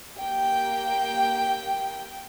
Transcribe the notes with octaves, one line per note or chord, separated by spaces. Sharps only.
A#3 G4 G5